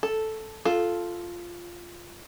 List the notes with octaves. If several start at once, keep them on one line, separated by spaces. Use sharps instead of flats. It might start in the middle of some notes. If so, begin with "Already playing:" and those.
A4
F4 A4